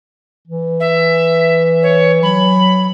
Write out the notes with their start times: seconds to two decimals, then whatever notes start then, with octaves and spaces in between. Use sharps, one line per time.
0.47 E3
0.80 E5
1.83 C#5
2.23 F#3 B5